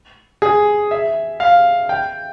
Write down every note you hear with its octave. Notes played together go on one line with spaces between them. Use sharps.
G#4
E5
F5
G5